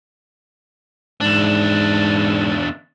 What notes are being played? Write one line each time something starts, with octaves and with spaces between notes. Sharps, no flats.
E2 G#2 D4